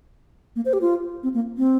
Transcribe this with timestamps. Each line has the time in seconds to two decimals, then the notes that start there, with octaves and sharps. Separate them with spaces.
0.56 A#3
0.65 C5
0.73 G4
0.81 F4
1.23 C4
1.34 A#3
1.57 C4